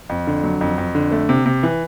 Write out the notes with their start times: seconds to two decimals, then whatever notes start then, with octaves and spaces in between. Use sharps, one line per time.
0.09 F2
0.27 D3
0.44 F#3
0.61 F2
0.78 F2
0.95 D3
1.11 A3
1.29 C3
1.46 C3
1.63 E3